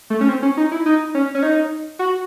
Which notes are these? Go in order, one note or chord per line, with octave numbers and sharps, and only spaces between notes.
A3
C#4
C4
C#4
D#4
E4
D#4
C#4
C#4
D#4
F#4